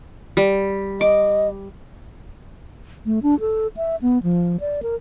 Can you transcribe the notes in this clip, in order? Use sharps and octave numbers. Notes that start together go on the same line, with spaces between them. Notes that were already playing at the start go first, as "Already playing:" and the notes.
G3
D#5 D6
A3
D4
A4
E5
B3
F3
D5
A#4